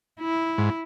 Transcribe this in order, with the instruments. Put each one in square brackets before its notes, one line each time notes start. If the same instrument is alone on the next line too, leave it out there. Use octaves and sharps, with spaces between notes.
[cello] E4
[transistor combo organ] G#2